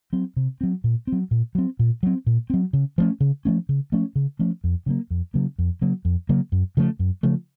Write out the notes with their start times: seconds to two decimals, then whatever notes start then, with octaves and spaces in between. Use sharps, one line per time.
0.13 F#3 C4
0.37 C3
0.61 F#3 C4
0.84 A#2
1.07 F#3 C4
1.31 A#2
1.55 F#3 C4
1.79 A#2
2.03 F#3 C4
2.26 A#2
2.50 F#3 C4
2.73 C#3
2.98 F3 A3 C#4
3.20 C#3
3.45 F3 A3 C#4
3.69 C#3
3.92 F3 A3 C#4
4.16 C#3
4.39 F3 A3 C#4
4.64 F2
4.86 C#3 F#3 A#3
5.11 F2
5.34 C#3 F#3 A#3
5.59 F2
5.81 C#3 F#3 A#3
6.05 F2
6.29 C#3 F#3 A#3
6.52 F#2
6.77 C#3 F3 A3
6.99 F#2
7.23 C#3 F3 A3